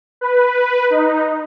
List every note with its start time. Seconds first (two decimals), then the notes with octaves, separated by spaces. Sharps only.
0.21 B4
0.90 D#4